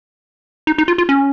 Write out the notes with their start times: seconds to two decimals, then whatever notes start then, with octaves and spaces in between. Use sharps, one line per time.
0.67 D#4
0.78 D#4
0.88 F4
0.98 F4
1.09 C#4